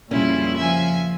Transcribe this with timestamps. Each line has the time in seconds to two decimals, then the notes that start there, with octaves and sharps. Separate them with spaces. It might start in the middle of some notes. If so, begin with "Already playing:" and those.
0.11 F2 A#2 C#3 G3 C#4 E4 F4
0.57 F3 E5 G#5